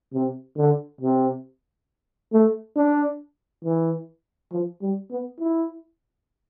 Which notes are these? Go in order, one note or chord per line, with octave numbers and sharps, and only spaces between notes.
C3
D3
C3
A3
D4
E3
F3
G3
B3
E4